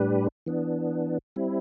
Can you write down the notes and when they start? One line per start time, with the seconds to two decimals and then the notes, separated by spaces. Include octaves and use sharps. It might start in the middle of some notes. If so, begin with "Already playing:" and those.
Already playing: A2 G3 D4 G4 B4
0.46 E3 B3 D4
1.36 G3 C4 E4